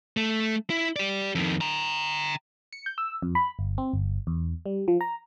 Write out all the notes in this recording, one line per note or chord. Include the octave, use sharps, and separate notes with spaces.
A3
E4
G4 D5
F2 D#3
G5 A#5
C#7
G6
E6
F2
B5
G1
C4
G1
E2
G3
F3
A#5